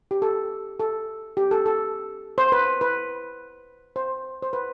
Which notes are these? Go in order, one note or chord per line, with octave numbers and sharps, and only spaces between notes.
G4
A4
A4
G4
A4
A4
C5
B4
B4
C5
C5
B4